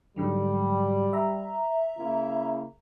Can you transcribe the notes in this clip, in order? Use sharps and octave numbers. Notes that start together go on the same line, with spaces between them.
G#2 D3 F#3 G3
E5 A#5
C#3 A#3 E4